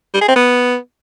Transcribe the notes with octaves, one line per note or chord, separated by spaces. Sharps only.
G3
G#4
C4
B3